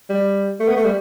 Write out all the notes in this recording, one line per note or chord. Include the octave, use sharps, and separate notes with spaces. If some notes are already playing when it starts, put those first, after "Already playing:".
G3
A3
B3
A3
G3